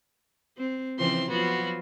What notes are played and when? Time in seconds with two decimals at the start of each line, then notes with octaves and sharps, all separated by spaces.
0.58 C4
0.98 C#3 E3 F3 C4 C6
1.29 F3 F#3 B3 F4 F#4